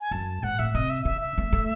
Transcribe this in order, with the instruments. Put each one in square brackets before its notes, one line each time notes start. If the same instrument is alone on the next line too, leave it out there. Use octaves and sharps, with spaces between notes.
[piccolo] G#5
[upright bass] F#2 [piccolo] A5
[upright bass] G#2 [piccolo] F#5
[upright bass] A2 [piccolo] E5
[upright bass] C3 [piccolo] D#5
[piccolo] E5
[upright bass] C#3 [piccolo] E5
[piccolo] E5
[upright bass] A3
A3